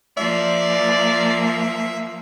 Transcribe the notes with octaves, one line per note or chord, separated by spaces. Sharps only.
F3 A#3 D5 E5